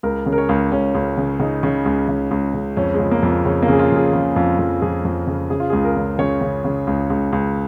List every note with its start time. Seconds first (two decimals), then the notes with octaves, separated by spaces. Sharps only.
0.03 C#2 A#4
0.26 C#3
0.32 A#4
0.38 C#5
0.49 C#2
0.72 C#2 C#4
0.95 C#2
1.17 C#3
1.40 C#3 D#4
1.63 C#3
1.86 C#2
2.08 C#3
2.31 C#2
2.54 C#3
2.77 F2 C#4
2.94 G#3
3.00 C#3
3.12 A#3
3.23 F2
3.28 A#3
3.45 C#3 C#4
3.63 A#3
3.68 C#3 G#4
3.79 F4
3.91 F2
3.97 G#4
4.13 C#3
4.36 F2
4.59 F2
4.82 F2 G#4
5.05 F2
5.27 C#3
5.50 C#3 G#4
5.60 F4
5.70 C#2 G#4
5.84 A#4
5.96 C#3
6.19 C#3 C#5
6.41 C#3
6.64 C#3
6.87 C#2
7.10 C#2
7.33 C#2